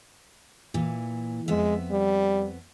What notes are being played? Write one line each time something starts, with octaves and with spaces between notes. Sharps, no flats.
A#2 E3
F2 G#3 B3 E5
G3